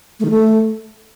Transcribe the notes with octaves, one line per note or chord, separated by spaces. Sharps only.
A3
D#3
A3